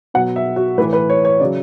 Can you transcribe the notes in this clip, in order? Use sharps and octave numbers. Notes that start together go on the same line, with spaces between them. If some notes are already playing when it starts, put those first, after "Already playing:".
B2 F#3 F#5
E5
F#4
A2 E3 B4
B4
C#5
C#5
C#3 F#3 D5